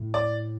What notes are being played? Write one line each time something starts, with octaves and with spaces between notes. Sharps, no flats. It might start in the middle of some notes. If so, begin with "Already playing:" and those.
Already playing: A2
D5